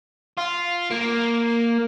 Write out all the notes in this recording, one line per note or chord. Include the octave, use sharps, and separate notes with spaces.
F4
A#3